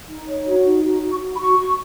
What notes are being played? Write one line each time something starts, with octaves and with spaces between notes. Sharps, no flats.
D#4
C#5
F#4
D#4
F#4
F#4
C#6
F#4
B5
F#4 C#6
F#4